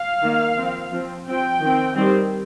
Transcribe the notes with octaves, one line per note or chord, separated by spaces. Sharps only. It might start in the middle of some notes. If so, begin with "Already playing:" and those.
Already playing: F5
D#3 A#3
F3 C4
F3 C4
F3 C4 G5
D#3 C4
D#3 G3 C4